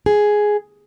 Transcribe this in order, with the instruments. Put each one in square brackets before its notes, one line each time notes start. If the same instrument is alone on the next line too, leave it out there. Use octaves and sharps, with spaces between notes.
[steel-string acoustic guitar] G#4